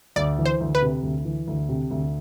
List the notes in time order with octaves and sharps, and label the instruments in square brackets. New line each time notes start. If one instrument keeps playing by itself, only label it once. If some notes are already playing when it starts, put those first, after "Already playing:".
[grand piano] D2 [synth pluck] D5
[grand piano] E3
[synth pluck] C5
[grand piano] D2
[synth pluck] B4
[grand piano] C3
D2
E3
D2
C3
D2